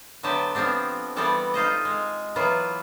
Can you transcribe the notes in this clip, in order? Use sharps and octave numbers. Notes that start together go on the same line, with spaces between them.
D3 F#3 A3 B3 G4 A5
F3 B3 C4 D4
E3 G3 B3 C4 A4 D5
D#4 F4 C5 D#5
G#3
E3 F#3 B3 F4 B4